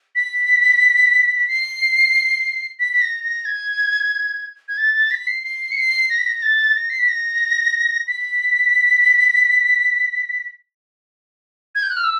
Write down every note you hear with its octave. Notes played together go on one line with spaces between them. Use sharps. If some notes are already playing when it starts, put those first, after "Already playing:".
B6
B6
C7
B6
B6
A#6
A#6
G#6
G#6
A6
A6
B6
C7
C7
C#7
C7
A#6
B6
A#6
A6
A#6
C7
B6
A#6
B6
G#6
G6
F#6
F6
E6